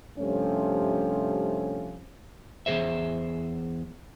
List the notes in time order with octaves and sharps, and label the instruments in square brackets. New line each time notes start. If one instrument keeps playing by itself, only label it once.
[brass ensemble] G2 C3 F3 A3 C#4
[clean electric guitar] E2 D#3 G#4 C5 E5